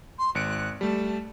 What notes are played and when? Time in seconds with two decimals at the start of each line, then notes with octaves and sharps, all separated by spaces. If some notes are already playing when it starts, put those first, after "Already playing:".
0.18 C6
0.35 G#1 F#6 C#7 D7
0.81 G3 A3 A5